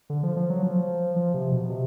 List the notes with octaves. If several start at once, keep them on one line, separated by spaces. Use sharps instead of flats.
D3
F3
F3
F#3
F3
F3
C3
B2
C3